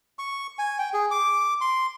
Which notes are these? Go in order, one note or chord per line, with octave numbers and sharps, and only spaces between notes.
C#6
G#5
G5
G#4
D6
C6